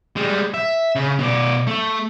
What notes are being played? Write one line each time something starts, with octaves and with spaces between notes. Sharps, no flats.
G3 G#3
E5
C#3
B2 D5
A3